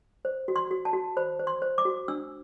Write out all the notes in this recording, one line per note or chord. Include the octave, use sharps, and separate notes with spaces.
C5
F#4
C6
F#4
A5
F#4
C5 B5
C5
C6
C5
D6
F#4
D4 E6